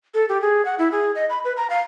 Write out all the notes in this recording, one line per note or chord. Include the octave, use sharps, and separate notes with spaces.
A4
G4
G#4
F#5
E4
G#4
D#5
B5
B4
A#5
F5